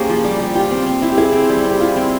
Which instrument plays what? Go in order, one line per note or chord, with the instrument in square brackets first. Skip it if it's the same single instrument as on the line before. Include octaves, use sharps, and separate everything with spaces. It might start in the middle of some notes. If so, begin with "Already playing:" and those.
Already playing: [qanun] A#3 C#4 [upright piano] G4 G#4 C5
[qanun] F3
G3
G3
[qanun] F4 [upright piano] G4
[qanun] C4
C4
E4
[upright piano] G4
[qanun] E4 [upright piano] G#4
[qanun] C4
G3
C4
[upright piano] G4
[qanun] E4 [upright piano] F4
[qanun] C4